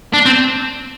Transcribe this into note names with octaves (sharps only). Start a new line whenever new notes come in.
D4
C4